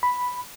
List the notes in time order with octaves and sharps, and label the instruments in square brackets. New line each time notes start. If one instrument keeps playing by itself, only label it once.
[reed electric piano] B5